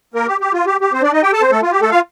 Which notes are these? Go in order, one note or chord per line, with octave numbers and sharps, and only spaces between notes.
A#3 A#4
G4
G4
F4
G4
G4
C4 C5
D4 D5
D#4 D#5
G4 G5
A4 A5
C4 C5
A3 A4
F4
G4
A3 A4
F4 F5